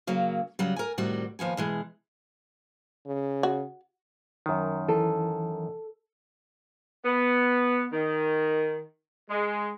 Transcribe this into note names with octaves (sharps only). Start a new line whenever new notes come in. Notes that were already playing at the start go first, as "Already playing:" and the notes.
C#3 F#3 A#3
C#3 F#3 G3
A#4 G#5
A2 C3 D#3 G3 F#4
D#2 F3 B3 G#5
B2 E3 G#3
C#3
F#4
F#2 D#3
E3 A4
B3
D#3
G#3